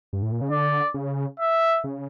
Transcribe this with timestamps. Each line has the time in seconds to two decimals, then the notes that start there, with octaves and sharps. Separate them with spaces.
0.13 G2
0.22 A2
0.32 A#2
0.41 C#3
0.50 D3 D5
0.94 C#3
1.40 E5
1.84 C#3